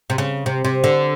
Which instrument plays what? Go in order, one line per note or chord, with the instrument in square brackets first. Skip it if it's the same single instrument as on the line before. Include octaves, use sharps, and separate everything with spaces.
[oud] C3
C#3
C3
C3
D3